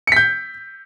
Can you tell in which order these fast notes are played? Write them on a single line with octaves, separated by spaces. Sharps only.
C#7 B6 G6